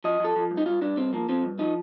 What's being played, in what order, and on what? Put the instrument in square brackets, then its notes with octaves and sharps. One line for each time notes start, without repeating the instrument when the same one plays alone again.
[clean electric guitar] F3 D#5
F3 A4
F3
G2
D#4
G2 F4
G2 D4
G2 C4
F3 A#3
F3 C4
G2
F3 D#4